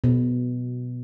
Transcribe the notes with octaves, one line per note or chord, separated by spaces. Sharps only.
B2